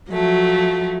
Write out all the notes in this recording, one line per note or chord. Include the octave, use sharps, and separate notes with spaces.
F3 F#3 A3